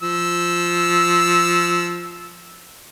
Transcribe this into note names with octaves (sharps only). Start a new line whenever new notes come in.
F3 E6